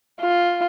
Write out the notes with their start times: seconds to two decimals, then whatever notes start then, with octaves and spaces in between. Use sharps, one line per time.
0.21 F4